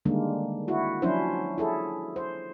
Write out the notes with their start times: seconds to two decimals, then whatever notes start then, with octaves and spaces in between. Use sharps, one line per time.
0.05 D3 D#3 G3 G#3 A#3 D4
0.68 E4 F#4
1.02 F3 F#3 C#4 D4 E4 C5
1.58 E4 G#4 A4
2.16 C5